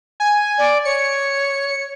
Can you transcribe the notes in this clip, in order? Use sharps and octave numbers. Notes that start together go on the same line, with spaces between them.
G#5
D5
C#5 C#7